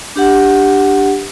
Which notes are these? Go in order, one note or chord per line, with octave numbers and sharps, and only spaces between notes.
D4 G4 F#5